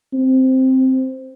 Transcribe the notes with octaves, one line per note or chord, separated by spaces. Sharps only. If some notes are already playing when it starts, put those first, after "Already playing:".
C4